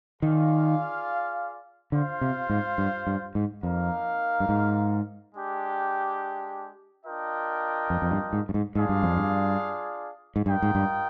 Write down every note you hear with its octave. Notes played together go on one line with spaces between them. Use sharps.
D#3 F4 G#4 D5 F5
D3 F4 C5 F5
C3
G#2
G2
G2
G#2
F2 A#3 D#4 A#4 F5
G2
G#2
G#3 D4 G4
D4 F4 A#4 D#5 G5
F2
F2
G2
G#2
G2
G#2
G#2 D4 F4 G#4 D5 F5
G2
F2
G2
G#2
G2 F4 A#4 D#5 G5
G#2
G2